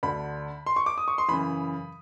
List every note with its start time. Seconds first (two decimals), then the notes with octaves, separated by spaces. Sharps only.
0.03 D2 D3 B5
0.66 C6
0.76 C#6
0.86 D6
0.98 D#6
1.08 C#6
1.18 C6
1.28 F#2 C#3 E3 B5